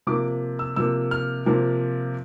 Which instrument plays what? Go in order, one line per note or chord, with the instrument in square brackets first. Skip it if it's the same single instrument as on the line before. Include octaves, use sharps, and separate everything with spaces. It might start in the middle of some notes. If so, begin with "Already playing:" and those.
[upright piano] C3 F3 A#3 D6
E6
C3 F3 A#3 E6
F6
C3 F3 A#3